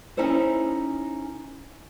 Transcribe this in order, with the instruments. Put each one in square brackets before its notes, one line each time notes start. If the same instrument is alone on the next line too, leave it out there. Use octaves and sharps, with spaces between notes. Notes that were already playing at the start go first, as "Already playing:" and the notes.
[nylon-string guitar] C#4 D#4 E4 A4 C5